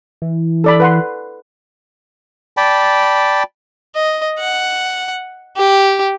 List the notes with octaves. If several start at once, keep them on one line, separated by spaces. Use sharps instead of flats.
E3
A4 D5 B5
B4 F#5 C6
D5 G5 A5 B5
D#5
F#5
G4